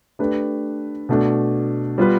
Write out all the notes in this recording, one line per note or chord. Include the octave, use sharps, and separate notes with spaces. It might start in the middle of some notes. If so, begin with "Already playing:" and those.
A3 D4 G4 B4
B2 A3 D4
G3 B3 F4 B4